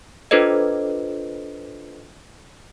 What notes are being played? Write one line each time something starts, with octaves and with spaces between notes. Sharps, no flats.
D4 F4 A4 B4 C5 D#5